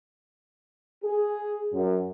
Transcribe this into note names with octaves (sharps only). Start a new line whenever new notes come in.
G#4
F#2